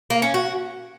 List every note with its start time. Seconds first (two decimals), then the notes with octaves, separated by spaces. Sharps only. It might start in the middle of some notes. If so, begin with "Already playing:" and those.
0.10 A#3
0.22 C#4
0.34 F#4